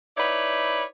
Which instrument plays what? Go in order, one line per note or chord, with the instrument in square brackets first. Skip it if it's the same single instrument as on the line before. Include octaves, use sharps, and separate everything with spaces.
[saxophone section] D#4 E4 B4 C#5 D5